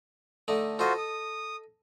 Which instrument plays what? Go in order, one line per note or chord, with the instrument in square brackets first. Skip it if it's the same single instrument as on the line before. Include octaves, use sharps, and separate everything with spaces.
[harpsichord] D3 A3 D#4
[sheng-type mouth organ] F4 F#4 C5 [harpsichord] A4 D#5
[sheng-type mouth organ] D#6